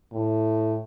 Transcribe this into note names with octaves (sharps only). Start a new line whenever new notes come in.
A2